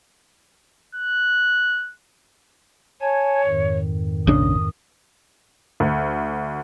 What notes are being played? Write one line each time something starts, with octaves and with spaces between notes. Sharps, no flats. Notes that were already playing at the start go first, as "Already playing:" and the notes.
F#6
C#5 G#5 A5 G#6
F2 G#2 D#3
A#1 C#3 D4 D#6
D2